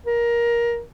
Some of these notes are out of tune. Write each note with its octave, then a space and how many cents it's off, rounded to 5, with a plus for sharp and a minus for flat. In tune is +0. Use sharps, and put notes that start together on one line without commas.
A#4 +15